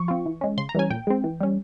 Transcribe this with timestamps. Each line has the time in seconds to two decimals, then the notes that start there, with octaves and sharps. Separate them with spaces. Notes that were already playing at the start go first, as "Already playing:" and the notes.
Already playing: F3 C#6
0.08 C4 F4
0.26 E3
0.41 G#3 C#4
0.58 C#3 C6
0.69 A#5
0.75 E3 G3 C#4 G#5
0.90 A#2 G5
1.07 G#3 C4
1.24 E3
1.41 G3 C#4